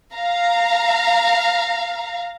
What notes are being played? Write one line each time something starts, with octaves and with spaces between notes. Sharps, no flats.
F5 A#5